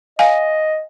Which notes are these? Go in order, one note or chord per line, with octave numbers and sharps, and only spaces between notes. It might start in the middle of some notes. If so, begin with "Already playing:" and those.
D#5 F5 G#5